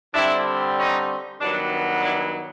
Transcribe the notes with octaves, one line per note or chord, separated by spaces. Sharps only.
D3 G3 C4 D4 E4
C#4 D#4
G2 D#3 F#3 B3 D4
D4 E4